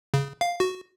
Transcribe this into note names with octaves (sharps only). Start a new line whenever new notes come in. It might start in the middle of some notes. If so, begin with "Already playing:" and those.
C#3
F5
F#4